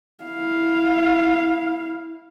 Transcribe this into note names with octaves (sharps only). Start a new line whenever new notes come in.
E4 F5